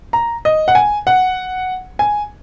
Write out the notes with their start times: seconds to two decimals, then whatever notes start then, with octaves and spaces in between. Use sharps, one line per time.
0.13 A#5
0.45 D#5
0.68 F#5
0.75 G#5
1.07 F#5
1.99 G#5